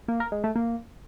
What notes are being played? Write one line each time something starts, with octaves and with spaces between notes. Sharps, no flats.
A#3
A#4
G#3
A3
A#3